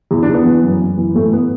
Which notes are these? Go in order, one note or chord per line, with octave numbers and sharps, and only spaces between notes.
E2
D4
E2 B3
E3
F#2
F#2
E3
A2 A3
A2 B3